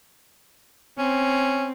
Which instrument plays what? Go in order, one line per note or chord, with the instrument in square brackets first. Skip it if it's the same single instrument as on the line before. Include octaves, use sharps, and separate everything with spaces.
[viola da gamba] C4 [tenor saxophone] C#4